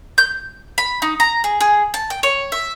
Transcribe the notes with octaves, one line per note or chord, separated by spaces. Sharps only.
G6
B5
D#4
A#5
G#4
G#4
A5
G5
C#5
E5